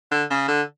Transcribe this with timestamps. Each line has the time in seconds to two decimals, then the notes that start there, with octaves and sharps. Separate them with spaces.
0.12 D3
0.31 C#3
0.48 D3